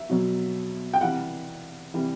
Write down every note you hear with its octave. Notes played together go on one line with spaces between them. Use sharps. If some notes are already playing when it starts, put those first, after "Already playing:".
Already playing: E5
B2 F#3
G5
C3 E3 G3 F#5
C3 E3 G3